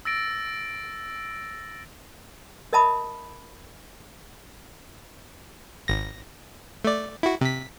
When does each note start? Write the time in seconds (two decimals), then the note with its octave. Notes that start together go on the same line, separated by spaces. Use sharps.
0.05 E6 A6 A#6 D7
2.73 A#4 D#5 E5 A5 B5 D#6
5.88 G#1 A#6
6.85 A3 D5
7.23 E4 F#4
7.41 C3 B6